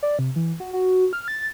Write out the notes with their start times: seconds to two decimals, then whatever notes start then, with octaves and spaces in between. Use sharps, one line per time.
0.03 D5
0.19 C3
0.36 E3
0.60 F#4
0.73 F#4
1.13 F6
1.28 A6